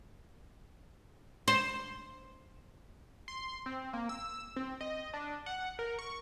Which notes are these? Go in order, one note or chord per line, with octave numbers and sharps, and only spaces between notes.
C5
C6
C4
A#3
E6
C4
D#5
D4
F#5
A#4
C#6